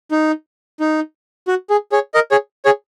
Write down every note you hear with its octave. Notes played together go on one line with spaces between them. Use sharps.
D#4
D#4
F#4
G#4
G#4 C#5
A#4 D#5
G#4 C#5
G#4 C#5